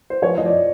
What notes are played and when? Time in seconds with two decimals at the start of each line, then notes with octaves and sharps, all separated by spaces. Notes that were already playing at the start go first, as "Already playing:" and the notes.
0.10 C5
0.22 F3 C#5
0.38 F3 D#5
0.45 D5